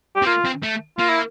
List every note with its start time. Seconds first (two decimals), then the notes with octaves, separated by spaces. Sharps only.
0.16 G4
0.22 C4
0.26 A#3 F4
0.45 C4
0.63 A3
0.98 A#3 F4
1.09 E4